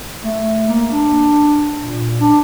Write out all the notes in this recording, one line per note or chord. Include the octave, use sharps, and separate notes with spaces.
A3
A#3
D4
A#2
D4